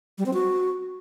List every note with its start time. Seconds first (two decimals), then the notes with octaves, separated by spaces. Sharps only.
0.18 G3
0.26 C4
0.34 F#4